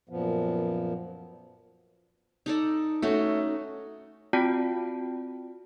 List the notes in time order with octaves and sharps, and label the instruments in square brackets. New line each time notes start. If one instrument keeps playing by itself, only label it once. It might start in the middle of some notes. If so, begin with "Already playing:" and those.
[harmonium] F#2 A#2 F3 B3
[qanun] D#4 A4 D5
[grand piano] A3 [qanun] C#4 D#4 F#4
[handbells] C4 F4 F#4 D5 G5 A5